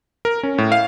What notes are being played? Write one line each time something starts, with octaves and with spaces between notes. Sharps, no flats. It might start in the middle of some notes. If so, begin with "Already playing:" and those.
A#4
C#4
A2
F5